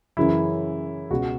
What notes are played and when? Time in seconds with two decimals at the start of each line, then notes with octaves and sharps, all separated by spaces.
0.17 F#2 C#3 E3 E4
1.10 C#2 B2 F#4